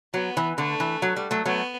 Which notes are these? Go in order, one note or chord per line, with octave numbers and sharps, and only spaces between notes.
F#3 B3
E3
D3 A3
E3
F#3
G3
F#3 A3
F#3 A3 B3